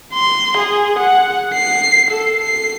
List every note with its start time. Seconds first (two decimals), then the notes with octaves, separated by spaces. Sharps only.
0.14 C6
0.57 G#4
0.99 F#5
1.54 C7
2.11 A4
2.44 C7